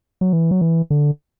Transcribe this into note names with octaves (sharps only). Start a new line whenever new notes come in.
F#3
E3
F#3
E3
D3